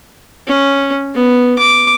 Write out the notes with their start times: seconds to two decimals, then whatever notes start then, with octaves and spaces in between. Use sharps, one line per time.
0.47 C#4
1.15 B3
1.59 D6